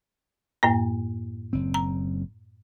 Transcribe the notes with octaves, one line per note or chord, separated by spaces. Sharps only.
F#2 A2 A#3
F#1 C4
A#5